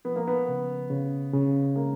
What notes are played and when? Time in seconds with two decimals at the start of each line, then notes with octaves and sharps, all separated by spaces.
0.05 F3 B3
0.16 A#3
0.27 B3
0.48 C#3
0.90 C#3
1.33 C#3
1.76 G#3 A#3